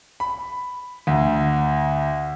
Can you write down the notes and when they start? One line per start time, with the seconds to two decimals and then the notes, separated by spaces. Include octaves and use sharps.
0.20 B5
1.07 D2